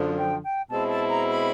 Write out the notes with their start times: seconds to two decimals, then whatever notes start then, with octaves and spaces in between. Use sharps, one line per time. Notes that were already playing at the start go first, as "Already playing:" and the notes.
Already playing: F#2 D3 F3
0.17 G5
0.43 G5
0.70 B2 G#3 C4 E4 A5
0.89 A5
1.09 A#5
1.29 B5